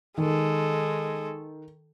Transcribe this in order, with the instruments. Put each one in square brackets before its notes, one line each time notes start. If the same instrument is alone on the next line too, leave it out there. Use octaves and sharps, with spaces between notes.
[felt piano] D#3 [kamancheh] G#3 A4